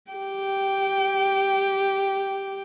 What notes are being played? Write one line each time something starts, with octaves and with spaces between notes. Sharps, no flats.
G4 G5